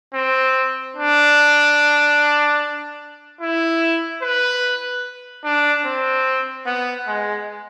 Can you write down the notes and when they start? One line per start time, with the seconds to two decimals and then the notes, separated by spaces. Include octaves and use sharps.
0.14 C4
0.96 D4
3.41 E4
4.22 B4
5.44 D4
5.85 C4
6.66 B3
7.07 G#3